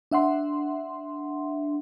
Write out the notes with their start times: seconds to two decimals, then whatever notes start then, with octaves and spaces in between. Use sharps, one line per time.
0.11 D4 E5 F#5 C6